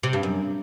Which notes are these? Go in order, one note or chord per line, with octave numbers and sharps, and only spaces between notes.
C3
G2
F#2